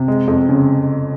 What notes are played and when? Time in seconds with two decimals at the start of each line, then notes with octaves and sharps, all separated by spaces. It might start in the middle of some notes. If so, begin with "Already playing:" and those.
Already playing: C3
0.08 G#3
0.28 F2
0.49 C#3